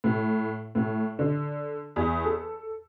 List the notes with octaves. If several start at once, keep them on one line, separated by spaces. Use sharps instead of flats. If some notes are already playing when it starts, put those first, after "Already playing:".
A2
A2
D3
E2
A4